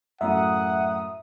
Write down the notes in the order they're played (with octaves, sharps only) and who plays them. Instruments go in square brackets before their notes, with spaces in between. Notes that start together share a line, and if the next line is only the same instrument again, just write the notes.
[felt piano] F#2 A2 [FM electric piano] E5 [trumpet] F#5 [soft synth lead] D#6